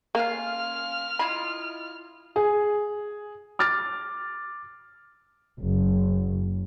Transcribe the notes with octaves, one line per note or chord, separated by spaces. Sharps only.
A#3 C#4 F4 F5 F6
E4 F4 D#5 B5
G#4
D6 F6 A6
F#1